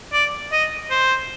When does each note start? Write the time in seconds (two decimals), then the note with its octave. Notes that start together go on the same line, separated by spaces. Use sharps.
0.13 D5
0.52 D#5
0.90 C5